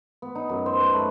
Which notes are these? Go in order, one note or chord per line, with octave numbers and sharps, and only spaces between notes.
B3
D#4
F#2
C5
B4
A3